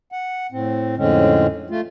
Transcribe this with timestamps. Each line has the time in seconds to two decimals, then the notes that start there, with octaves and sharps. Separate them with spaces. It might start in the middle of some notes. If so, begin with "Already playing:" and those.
0.12 F#5
0.52 A2 C4
0.97 F2 A2 D3 G#3 C4 C#4
1.70 A3 F4